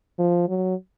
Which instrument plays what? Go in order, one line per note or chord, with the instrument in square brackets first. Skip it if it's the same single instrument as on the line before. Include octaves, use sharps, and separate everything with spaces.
[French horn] F3
F#3